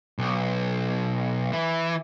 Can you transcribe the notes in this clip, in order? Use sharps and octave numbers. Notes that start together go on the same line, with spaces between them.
B1
E3